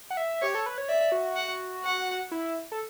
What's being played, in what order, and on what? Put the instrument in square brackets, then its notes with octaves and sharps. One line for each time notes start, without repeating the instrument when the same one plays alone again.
[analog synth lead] F#5
E5
[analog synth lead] G4 [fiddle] C#5
[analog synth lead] A4
B4
C#5
[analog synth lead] D5 [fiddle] E5
[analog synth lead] F#4
[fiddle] F#5
F#5
[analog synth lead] E4
A4